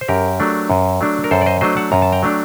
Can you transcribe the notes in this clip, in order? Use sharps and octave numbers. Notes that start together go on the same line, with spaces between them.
C5
F#2 G4 A#4
F#3 A3 D4
F#2
F#3 A3 D4
A#4
F#2 A4 C5
D5
C5 D#5
F#3 A3 D4 C5 D#5
F#5 A5
F#2 A#5
A5
G5 A#5
F#3 A3 D4